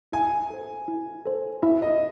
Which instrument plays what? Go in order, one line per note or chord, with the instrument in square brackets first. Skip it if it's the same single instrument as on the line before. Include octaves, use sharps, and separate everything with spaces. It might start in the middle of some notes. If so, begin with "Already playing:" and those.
[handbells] E4 [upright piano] G#5
[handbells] A4 C5
E4
A4 C5
[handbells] E4 [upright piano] E5
[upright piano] D#5